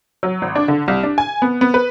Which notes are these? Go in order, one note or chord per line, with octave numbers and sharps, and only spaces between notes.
F#3
G#1
D4
D3
C2
D4
G#5
B3
B3
B4